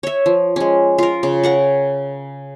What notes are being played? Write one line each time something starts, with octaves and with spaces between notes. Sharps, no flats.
C#5 E5
F3
G#3 C#4
F4 A#4
C#3
A#4 F#5 C#6